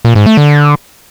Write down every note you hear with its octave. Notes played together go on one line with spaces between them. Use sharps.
A#2
G#2
A3
D3